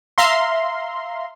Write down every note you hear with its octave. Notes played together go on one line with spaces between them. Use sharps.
E5 F5 A#5 C6